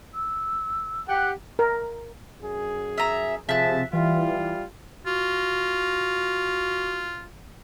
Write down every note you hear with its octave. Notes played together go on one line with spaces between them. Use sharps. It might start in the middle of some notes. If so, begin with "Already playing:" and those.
E6
G4 F#5
A#4
F#2 G#4
E5 A#5
C3 F3 G#4 E5 A5 F#6
E3 G3 F4
F4 F#4